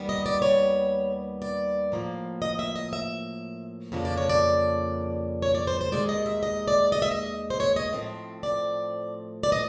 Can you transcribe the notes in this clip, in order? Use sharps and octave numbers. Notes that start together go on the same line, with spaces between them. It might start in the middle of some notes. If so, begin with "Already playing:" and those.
Already playing: D#2 D#3 G3 B3
D#5
D5
C#5
D5
A2 F3 A#3
D#5
E5
D#5
E5
F2 C#3 F3 A#3 D4
D5
C#5
D5
C#5
D5
C5
C5
D#2 D#3 G#3 D5
D#5
E5
D#5
D5
D#5
E5
D#5
C5
C#5
D#5
A2 F3 A3 C4
D5
D5
D#5